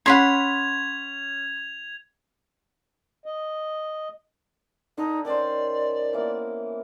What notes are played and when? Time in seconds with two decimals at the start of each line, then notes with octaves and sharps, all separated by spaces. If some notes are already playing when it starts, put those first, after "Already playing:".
0.06 C#4 F#5 B5 C6 G#6 B6 F7
3.26 D#5
4.98 D3 D#4
5.25 D#3 C#4 C5 D5
6.13 E3 A#3 B3